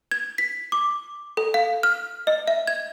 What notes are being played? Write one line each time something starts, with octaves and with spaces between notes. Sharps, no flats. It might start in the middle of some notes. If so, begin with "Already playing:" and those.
G#6
B6
D6
A4
F5
F6
D#5
E5
G#6